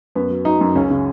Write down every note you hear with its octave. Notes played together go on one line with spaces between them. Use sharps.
F#2 B3
F#3
F#3 D#4
F#2
C#2 C#4
C#3